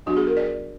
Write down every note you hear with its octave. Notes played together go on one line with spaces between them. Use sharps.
F#3 B3 D4 F#4
G#4
A#4
D5